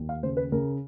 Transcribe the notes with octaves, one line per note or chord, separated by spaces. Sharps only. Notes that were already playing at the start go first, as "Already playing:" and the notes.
Already playing: D#2
F5
C#3 C5
B4
C#3 A#4